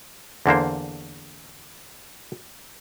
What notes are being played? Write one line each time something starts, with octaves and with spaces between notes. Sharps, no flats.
E2 D3 A#3 C5